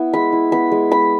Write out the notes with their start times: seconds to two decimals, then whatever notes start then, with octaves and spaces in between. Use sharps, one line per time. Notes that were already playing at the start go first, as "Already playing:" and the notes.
Already playing: B3 E4
0.13 G#3 B5
0.33 E4
0.52 B3 B5
0.72 G#3
0.91 G#3 B5